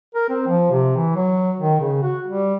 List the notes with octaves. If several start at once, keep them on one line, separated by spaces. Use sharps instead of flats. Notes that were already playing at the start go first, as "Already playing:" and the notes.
A#4
C4
F3
C3
E3
F#3
D#3
C#3
F#4
G3